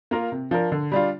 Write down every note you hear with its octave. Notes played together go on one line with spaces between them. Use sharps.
A#3 F4 A#4
C3
F3 D4 A#4
D3
G3 D4 F4